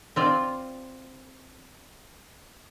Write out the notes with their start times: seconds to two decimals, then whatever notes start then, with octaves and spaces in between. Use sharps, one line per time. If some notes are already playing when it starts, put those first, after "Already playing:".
0.16 C4 F4 D5